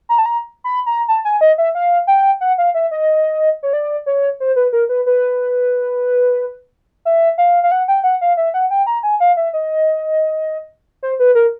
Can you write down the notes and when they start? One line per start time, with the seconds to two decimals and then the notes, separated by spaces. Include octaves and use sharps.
0.09 A#5
0.18 A5
0.26 A#5
0.64 B5
0.86 A#5
1.08 A5
1.25 G#5
1.41 D#5
1.58 E5
1.75 F5
2.07 G5
2.41 F#5
2.58 F5
2.74 E5
2.91 D#5
3.63 C#5
3.73 D5
4.06 C#5
4.40 C5
4.56 B4
4.73 A#4
4.89 B4
5.06 B4
7.05 E5
7.38 F5
7.63 F5
7.72 F#5
7.88 G5
8.04 F#5
8.21 F5
8.37 E5
8.54 F#5
8.71 G5
8.87 A#5
9.03 G#5
9.20 F5
9.37 E5
9.53 D#5
11.03 C5
11.20 B4
11.35 A#4